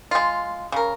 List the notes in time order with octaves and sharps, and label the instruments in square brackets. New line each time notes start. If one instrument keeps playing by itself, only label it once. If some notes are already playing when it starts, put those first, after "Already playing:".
[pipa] G#3 F4
C#3 A#4